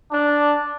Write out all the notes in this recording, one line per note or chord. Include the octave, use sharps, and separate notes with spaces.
D4